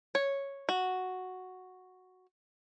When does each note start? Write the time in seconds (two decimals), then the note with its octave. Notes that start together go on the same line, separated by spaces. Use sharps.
0.15 C#5
0.69 F#4